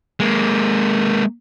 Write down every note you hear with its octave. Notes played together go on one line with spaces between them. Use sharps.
G#3 A#3